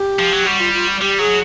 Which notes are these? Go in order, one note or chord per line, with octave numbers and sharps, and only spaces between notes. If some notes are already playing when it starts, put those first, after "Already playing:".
Already playing: G4
F3
F#3
G3 F#4
F4
F4
F#4
G3 G4
F#3 G#4